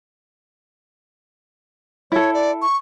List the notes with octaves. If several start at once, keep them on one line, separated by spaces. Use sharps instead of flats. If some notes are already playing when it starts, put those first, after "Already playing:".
E4 A4 C#5
D5
C#6